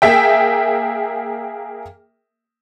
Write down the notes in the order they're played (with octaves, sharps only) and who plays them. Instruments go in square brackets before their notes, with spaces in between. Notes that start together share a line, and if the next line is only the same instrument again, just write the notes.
[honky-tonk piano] A#3 G#4 E5 G5